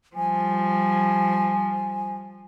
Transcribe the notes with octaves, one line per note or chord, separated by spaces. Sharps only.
F3 G3 G#5